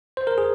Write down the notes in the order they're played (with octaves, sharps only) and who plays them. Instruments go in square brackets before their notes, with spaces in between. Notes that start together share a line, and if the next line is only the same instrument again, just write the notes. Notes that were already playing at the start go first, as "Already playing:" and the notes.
[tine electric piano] C5
A#4
G#4